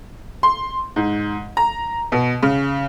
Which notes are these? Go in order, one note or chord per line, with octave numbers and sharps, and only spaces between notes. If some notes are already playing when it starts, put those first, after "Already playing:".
C6
G#2
A#5
B2
C#3